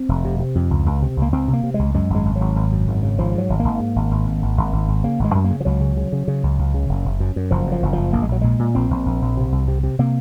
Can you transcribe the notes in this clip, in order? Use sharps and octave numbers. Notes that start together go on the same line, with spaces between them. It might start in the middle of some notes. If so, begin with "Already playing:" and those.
Already playing: C4
F1
C3
C3
F2
C#2
C#2
C3
C#2
A#3
C#2 C4
C3
A#3
C3
C#2 G#3
F#2 G#3
G#1 G#3
G#1
F#3
G#1
G#1
F#2
G#1
C#3
G#1 F3
G#2 F#3
G#1
G#1 A#3
G#2
G#1
G#1
G#1
G#1
G#1
G#1
G#1
C#3 A#3
G#1
G#3
F#2
A#3
C#3
F3
C#2 F#3
C#3
C#3
C#3
C#3
C#2
C#2
C#3
F#1
F#1
F#2
F#2
F#1 F3
F#2 F3
F#1
F#1 F3
A#1 A#3
G#3
A#1 F#3
A#2 G#3
A#2
A#1 C4
A#1
A#1
A#1
C3
C2
C3
C3
C3 A#3